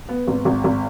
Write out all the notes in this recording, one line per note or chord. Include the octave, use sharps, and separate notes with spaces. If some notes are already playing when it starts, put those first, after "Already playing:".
B3
G#1
G#1
G#1